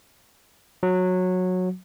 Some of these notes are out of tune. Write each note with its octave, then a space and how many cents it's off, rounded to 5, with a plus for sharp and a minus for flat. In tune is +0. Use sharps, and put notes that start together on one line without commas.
F#3 -15